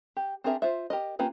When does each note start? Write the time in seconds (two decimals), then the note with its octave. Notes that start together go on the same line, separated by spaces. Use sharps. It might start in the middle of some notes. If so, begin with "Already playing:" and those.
0.17 G4
0.44 C4 D4 G#4 A#4 E5
0.62 F4 C5 E5
0.90 G4 A#4 D#5
1.19 A#3 C#4 F4 G4 B4